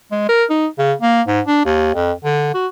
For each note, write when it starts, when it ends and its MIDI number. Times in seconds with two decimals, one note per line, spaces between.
0.12 0.25 56
0.29 0.44 70
0.50 0.67 63
0.78 0.93 49
1.02 1.22 58
1.27 1.41 44
1.46 1.65 62
1.65 1.92 39
1.94 2.12 41
2.24 2.53 50
2.54 2.67 66